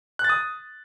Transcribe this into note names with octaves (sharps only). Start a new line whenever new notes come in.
F#6
A6
D#6